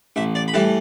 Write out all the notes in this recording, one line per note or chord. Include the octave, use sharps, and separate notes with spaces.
A1 E5
D5
B5
A2 E3 G3 A5